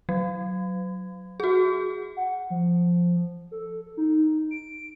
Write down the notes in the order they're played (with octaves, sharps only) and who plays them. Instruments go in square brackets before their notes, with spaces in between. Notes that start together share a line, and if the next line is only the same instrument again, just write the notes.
[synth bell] F#3
F#4 G#4
[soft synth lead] F#5
F3
A4
D#4
D7